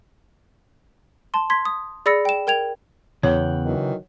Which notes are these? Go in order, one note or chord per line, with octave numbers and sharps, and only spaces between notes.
A5 C6
C6 G#6 B6
D#6
G#4 D5 B5 E6 A#6 C#7
G5 E7
A#4 G5 G#6 F7
E2 C#3 C#5 F#5 G5
D#3 E3 F#3